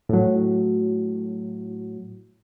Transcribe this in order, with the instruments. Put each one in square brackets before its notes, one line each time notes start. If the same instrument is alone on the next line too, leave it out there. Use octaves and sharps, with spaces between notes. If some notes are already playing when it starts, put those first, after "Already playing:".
[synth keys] A2 F#3